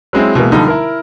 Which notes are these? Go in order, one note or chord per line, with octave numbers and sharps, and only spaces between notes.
F#3 G#3 C4 E4
B2 E3 G#3 A#3
D3 F3 G3 D#4
E4 A#4